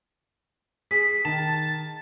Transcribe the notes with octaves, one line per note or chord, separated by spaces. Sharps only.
G#4 B6
D#3 A5